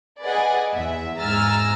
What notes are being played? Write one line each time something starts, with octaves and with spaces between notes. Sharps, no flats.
G#4 B4 D5 D#5 F#5 G#5
E2 E5
G#2 G#5 A#5 E6 F6 A6